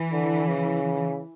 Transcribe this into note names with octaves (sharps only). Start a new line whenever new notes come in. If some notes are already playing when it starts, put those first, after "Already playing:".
Already playing: E3
D3
C#3